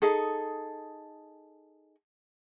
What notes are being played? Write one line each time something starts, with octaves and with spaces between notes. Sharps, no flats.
D#4 G#4 A4